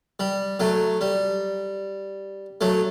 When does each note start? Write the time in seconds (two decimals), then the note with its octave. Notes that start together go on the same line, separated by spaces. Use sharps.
0.20 G3
0.60 F#3 A3
1.01 G3
2.61 F#3 A3